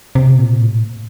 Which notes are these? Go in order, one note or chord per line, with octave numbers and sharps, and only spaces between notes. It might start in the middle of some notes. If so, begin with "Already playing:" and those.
C3
A#2
A2